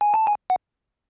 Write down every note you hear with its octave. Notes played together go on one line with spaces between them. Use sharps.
G#5
A5
G#5
F#5